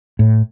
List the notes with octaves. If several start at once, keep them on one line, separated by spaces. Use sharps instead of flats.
A2